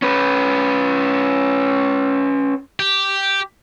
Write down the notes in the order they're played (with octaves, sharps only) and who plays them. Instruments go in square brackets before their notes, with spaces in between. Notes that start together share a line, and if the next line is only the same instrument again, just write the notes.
[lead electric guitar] C#4 B4
[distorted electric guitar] G4